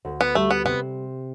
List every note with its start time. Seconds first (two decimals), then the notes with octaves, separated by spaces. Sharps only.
0.05 D2
0.21 B3
0.35 G3 A3
0.51 B3
0.65 C3 B3